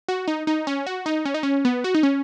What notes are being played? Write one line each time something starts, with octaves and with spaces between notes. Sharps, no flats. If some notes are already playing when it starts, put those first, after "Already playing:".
F#4
D#4
D#4
C#4
F#4
D#4
C#4
D#4
C#4
B3
F#4
D#4
C#4